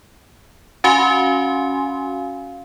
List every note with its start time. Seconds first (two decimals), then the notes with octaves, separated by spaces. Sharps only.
0.84 C#4 F#4 F5 G#5 C6